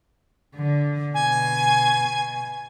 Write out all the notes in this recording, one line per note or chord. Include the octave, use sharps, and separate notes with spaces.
D3
B2 G#5